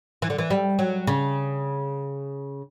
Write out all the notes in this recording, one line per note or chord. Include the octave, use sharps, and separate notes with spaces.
E3
D3
E3
G3
F#3
C#3